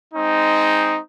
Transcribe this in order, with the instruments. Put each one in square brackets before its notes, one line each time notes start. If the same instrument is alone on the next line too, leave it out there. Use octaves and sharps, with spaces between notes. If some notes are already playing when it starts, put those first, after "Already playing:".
[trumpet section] G#3 C4 D#4